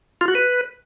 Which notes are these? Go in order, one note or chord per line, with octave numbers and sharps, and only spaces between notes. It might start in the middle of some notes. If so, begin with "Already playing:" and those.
F4
F#4
B4